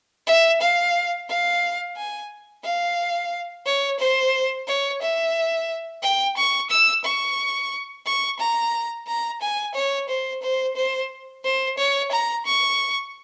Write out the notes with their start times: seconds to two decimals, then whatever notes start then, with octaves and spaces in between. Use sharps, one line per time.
0.27 E5
0.61 F5
1.29 F5
1.97 G#5
2.64 F5
3.66 C#5
3.99 C5
4.67 C#5
5.02 E5
6.03 G5
6.37 C#6
6.70 E6
7.05 C#6
8.06 C#6
8.39 A#5
9.07 A#5
9.41 G#5
9.75 C#5
10.09 C5
10.42 C5
10.76 C5
11.44 C5
11.78 C#5
12.12 A#5
12.46 C#6